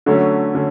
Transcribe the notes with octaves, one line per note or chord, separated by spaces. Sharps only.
D3 F#3 A3 C#4
D3 C#4